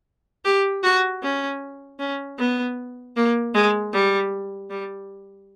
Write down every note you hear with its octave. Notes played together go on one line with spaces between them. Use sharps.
G4
F#4
C#4
C#4
B3
A#3
G#3
G3
G3